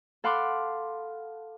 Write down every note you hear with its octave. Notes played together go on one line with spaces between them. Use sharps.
A4 F5 F#5 B5 C6 D6